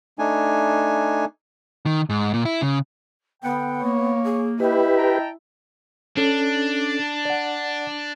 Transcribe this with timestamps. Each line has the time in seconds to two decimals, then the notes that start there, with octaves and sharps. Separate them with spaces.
0.19 A3 D4 D#4 G#5
1.86 D#3
2.09 G#2
2.34 A#2
2.45 E4
2.62 C#3
3.43 D3 B3 F#5 G5
3.82 A#3 C#5
4.24 G#4
4.60 E4 G4 B4 D#5
4.96 G5 A5 A#5
6.17 C#4 D4 A4
7.25 D5 F#5